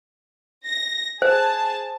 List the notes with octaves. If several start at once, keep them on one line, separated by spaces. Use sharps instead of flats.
A#6
G#4 C5 A5